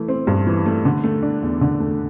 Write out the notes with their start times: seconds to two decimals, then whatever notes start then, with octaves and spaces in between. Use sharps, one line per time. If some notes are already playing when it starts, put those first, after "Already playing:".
Already playing: E3 A3
0.08 C4
0.27 G2
0.47 E3
0.66 A3
0.85 D3
1.04 A3
1.23 D4
1.43 E2
1.61 D3
1.80 A3